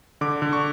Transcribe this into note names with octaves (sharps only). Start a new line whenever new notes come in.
D3 D6
D3
C#6